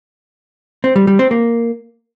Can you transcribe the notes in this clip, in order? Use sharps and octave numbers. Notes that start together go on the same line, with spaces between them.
C4
G3
G3
C4
A#3